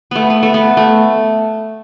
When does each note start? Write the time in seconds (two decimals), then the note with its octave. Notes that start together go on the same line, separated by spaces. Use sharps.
0.11 A3 B3
0.30 B3
0.43 A3
0.54 B3
0.77 A3